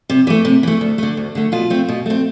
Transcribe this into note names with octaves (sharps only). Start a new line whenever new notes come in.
C3
E3 A3
C3
E3 A3
D2
D3 A3
D2
D3 A3
B2 F4
A3 C4
B2
A3 C4